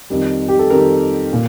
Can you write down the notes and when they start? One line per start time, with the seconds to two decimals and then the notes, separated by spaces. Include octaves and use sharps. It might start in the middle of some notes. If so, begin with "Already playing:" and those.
0.10 F2 D#3 G3
0.48 G4
0.59 A4
0.70 F2 D#3 G3 A#4
1.33 A#2